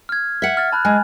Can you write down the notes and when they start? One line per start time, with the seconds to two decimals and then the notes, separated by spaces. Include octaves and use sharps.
0.09 F6 G#6
0.42 E5 F#5
0.57 F6 A6
0.72 A5 B5 F#6
0.85 G#3 G#5